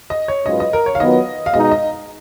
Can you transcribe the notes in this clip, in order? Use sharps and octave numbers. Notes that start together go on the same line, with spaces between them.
D#5
C#5
G#2 F#3 C#4 F4 B4 D#5
D#5
A#4
C#5
F5
D#3 F#3 B3 F4 D#5
F5
B2 G#3 D#4 D#5
D#5